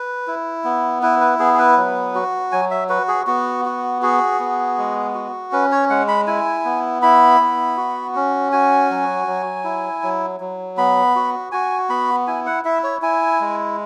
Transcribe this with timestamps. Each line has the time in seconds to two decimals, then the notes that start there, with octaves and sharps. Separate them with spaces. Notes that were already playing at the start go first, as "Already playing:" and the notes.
Already playing: B4
0.27 E4
0.64 B3
1.02 E4 B4
1.21 B4
1.39 B3 G#4
1.54 G#4
1.59 B4
1.77 F#3
2.15 F#4
2.52 F#3 G#5
2.71 E5
2.89 F#4 B4
3.08 G#4
3.27 B3 F#4
3.65 F#4
4.02 F#4 G#4
4.39 B3
4.78 G#3
5.14 F#4
5.52 C#4 B4
5.72 C#5
5.90 G#3 F#5
6.08 B5
6.27 E4 G#5
6.65 B3
7.02 E4 B5
7.40 B3
7.77 F#4
8.15 C#4
8.52 F#4 G#5
8.90 F#3
9.27 F#3
9.64 E4
10.03 F#3
10.40 F#3
10.77 B3 B5
11.15 F#4
11.52 F#4 G#5
11.89 B3 B5
12.27 E4 G#5
12.46 F#5
12.65 E4 E5
12.83 C#5
13.02 E4 G#5
13.40 G#3